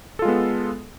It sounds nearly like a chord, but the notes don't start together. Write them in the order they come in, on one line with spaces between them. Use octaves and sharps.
A4 F4 G#3 B3